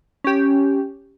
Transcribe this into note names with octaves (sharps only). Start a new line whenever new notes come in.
C#4 G4